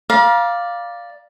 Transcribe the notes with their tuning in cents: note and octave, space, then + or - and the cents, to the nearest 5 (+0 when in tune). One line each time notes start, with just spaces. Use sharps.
D5 +0 F5 +0 A#5 +40